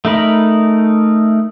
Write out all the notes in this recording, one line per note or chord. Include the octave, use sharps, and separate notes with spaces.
A3 D#4 A#4 B5